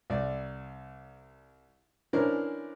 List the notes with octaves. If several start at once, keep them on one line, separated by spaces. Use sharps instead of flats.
C2 D5
E3 C#4 D4 E4 A#4 C5